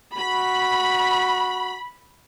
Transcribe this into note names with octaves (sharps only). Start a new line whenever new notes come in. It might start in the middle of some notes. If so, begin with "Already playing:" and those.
F#4 B5